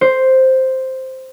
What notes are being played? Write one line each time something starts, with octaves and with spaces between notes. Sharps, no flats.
C5